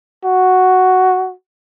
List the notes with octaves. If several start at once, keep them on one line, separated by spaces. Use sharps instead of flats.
F#4